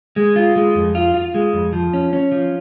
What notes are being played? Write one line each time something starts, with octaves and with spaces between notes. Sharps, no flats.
G#3
F4
G#3
F2
F4
F4
G#3
F2
F3
C#4
C#4
F3